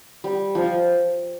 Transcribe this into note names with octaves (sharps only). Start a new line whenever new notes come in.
G3
F3